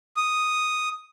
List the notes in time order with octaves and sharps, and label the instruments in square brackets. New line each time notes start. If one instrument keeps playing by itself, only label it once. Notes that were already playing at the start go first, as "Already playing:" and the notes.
[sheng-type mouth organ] D#6